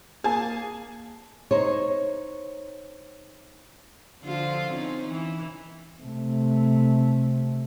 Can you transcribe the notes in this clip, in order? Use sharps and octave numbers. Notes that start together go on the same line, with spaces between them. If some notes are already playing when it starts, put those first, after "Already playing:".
A#3 G#4 G#5 A5
D#4 C5 C#5
D3 F3 F4
C4 C#4 D#4
E3
C3 A3